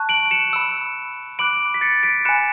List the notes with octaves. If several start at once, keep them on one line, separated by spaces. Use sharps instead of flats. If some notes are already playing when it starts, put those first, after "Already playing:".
Already playing: A5 C#6 F#6
D7 F#7
C#7 E7
B5 E6
B5 D6 F#6 D7 F#7
B6
A6 C#7
B6 D7
G#5 B5 F#6 C#7 E7